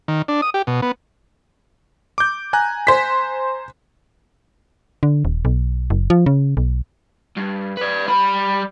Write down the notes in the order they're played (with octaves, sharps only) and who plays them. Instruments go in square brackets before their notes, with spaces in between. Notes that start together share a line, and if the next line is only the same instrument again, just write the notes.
[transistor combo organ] D#3
D4
D#6
G4
B2
B3
[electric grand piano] D6 G6
G#5 A#5 F#6
[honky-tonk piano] C5 B6
[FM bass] D3
D#1
B1
F#1
F3
C#3
B1
[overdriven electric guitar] G2
B4 D5
G3 B5